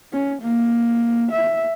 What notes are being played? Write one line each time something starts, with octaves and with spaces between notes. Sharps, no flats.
C#4
A#3
E5